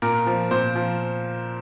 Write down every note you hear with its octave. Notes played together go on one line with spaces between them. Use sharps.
A#2 A#4
F3
A#2 C5
F3